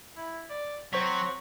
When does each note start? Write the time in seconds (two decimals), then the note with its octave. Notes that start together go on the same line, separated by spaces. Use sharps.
0.17 E4
0.50 D5
0.93 F#3 C4 C5 C#6 B6